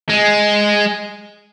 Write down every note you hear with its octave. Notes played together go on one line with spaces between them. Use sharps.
G#3